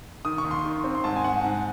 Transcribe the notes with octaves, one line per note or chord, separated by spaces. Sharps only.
D#3 D#6
C#6
D#2
C6
D#3
C4
C6
G#2 A5
G#5
G#2 F#5
G#2